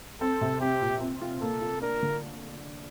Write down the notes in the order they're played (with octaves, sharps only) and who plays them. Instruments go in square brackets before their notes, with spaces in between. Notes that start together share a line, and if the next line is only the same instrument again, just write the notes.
[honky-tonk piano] C4 [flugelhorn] A4
[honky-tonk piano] C3
[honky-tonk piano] C4 [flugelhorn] G4
[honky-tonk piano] A#2
C4
F4
[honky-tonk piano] A#3 [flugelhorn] A4
[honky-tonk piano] F4
[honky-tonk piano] D4 [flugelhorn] A#4
[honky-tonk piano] D3